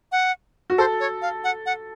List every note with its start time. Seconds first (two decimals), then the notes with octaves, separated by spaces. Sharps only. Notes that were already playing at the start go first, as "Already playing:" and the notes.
0.12 F#5
0.70 F#4
0.78 A4 C5
1.00 C#5
1.22 F5
1.44 F#5
1.66 F#5